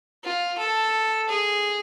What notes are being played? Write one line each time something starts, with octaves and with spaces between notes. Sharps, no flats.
F4
A4
G#4